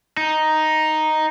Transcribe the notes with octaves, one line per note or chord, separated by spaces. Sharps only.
D#4